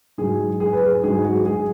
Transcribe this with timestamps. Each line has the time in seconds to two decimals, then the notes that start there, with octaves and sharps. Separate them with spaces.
0.18 G#2 F#3 G#4
0.60 G#4
0.73 B4
0.83 G#4
1.03 G#2 F#3 G#4
1.24 F#4
1.45 G#4